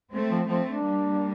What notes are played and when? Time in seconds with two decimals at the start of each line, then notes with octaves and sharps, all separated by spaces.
0.12 A3 C4
0.30 F3
0.49 F3 A3 C4
0.67 D4
0.86 G3 A#3